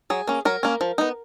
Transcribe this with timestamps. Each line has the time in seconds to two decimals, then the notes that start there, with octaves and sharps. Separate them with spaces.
0.10 F#3 G#4
0.28 A#3 C#4
0.45 F#3 A#4
0.63 A#3 C#4
0.81 F3
0.98 B3 D#4